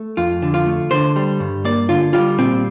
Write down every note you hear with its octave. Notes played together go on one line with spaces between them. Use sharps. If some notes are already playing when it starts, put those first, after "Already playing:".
Already playing: A3
F2 F4
D3
F4
A3
D3 C5
G3
G2
A#3 D5
D3 F4
G3 F4
A#2 C4